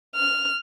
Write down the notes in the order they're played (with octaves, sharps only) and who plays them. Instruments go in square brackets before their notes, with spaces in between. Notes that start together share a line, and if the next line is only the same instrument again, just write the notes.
[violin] F6